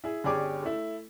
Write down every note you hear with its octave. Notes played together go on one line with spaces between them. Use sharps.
E4 G#4
G1 C#4 G4 G#4 D5 D6
A3 E4